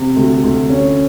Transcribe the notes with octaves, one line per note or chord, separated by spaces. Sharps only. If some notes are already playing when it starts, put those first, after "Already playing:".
Already playing: C3
D2
D2
C#4